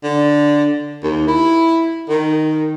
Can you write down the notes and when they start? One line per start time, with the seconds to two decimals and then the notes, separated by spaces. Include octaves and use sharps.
0.04 D3
1.03 D#2
1.28 E4
2.09 D#3